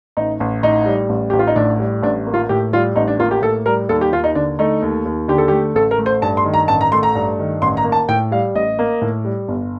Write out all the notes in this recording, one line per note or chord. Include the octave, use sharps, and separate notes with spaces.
A1 D#4
A1
A2 D#4
G3
A1
A1 G4
F4
D#4
A2 D4
G3
A1 D4
A#3
F4
A2 G4
G3 F4
A1 D#4
D4
A#3 F4
G4
A2 A4
G3 A#4
D#2 A4
G4
D#2 F4
D#4
D3 D4
A3 D#4
D#2
D#2
D3 G4
A4
G4
A3
A1 A4
A#4
A3
C5
G2 A5
C6
D#3
A#5
A1 A5
A#5
A3 C6
A#5
G2
D#3
A1 C6
A#5
A#3
A5
A2 G5
G3 F5
A1 D#5
A#3
A2
G3
G1